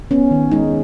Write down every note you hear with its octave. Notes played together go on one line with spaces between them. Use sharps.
B3 C#4
D#3
G#3 D#4